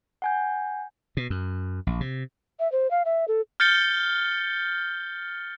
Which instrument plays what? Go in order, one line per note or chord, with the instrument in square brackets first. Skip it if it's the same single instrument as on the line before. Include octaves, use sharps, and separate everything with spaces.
[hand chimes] F#5 G#5 G6
[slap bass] B2
F#2
A#1
C3
[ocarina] E5
C5
F5
E5
A4
[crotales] F6 G6 A6 C#7 G7